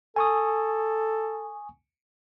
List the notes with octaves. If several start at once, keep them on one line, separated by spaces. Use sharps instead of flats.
A4 G#5 C#6 D#6